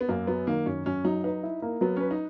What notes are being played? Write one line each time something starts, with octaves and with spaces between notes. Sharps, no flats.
B3
F#2 A#3
F#3 B3
D#3 A#3
F#2 C#4
F#2 C#4
F#3 D#4
D#4 B4
E4
A#3
F#3 B3
C#4 B4
D#4